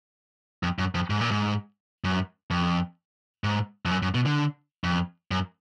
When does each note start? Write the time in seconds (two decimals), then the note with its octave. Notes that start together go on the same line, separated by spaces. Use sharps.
0.63 F2
0.79 F#2
0.95 F2
1.10 G#2
1.21 A#2
1.31 G#2
2.04 F#2
2.51 F2
3.44 G#2
3.85 F2
3.91 F#2
4.02 F#2
4.15 B2
4.26 D3
4.84 F2
5.31 F#2